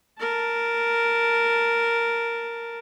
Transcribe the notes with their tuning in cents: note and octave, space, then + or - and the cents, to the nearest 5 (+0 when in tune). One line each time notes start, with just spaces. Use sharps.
A#4 +0 A5 +10